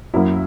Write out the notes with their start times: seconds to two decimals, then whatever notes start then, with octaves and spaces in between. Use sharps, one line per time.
0.14 F#2 F#3 A#3 E4